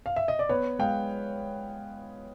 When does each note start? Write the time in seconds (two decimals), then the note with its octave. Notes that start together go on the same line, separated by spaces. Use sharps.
0.06 F5
0.16 E5
0.28 D#5
0.39 D5
0.49 B3 B4 C#5
0.79 G#3 F5 G5